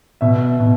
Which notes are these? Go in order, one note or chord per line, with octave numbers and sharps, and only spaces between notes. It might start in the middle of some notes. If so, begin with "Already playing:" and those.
B2 E5
B2